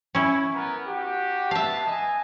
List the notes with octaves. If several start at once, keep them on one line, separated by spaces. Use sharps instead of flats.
C#4 E4
B3 A#4
F#4 G4
B3 E5 F5 A5
D#5 G#5